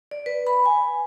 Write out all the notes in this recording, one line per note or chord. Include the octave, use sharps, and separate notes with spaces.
D5
B4
B5
G#5